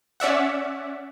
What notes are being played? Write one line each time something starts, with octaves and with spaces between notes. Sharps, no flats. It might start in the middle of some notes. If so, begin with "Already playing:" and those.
C#4 D5 E5 F#5